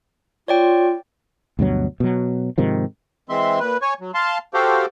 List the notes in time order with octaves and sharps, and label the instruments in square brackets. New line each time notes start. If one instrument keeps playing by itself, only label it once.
[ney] F4 [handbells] C#5 D5 G5
[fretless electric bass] D2 G2 B2 F#3
B2 F#3
G#2 C3 D#3 F3
[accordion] E3 G#3 C4 E5 C6
A#2 B4
C#5 G#5 C#6
F#3
F5 A5 C6
F#4 G4 A4 C5 F5 G5